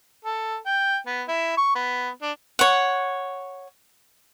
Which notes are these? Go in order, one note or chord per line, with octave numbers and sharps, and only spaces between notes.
A4
G5
B3
E4
C#6
B3
D4
C#5 F#5